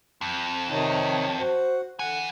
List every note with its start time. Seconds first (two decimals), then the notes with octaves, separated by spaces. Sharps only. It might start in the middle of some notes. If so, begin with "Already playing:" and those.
0.21 F2
0.69 C3 D#3 D#4 C#5
1.39 F#4 C5 F#5
1.99 D3 E3 F#5 G#5